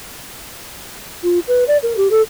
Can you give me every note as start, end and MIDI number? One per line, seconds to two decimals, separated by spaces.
1.23 1.39 65
1.48 1.64 71
1.68 1.77 74
1.83 1.93 70
1.97 2.10 67
2.11 2.21 69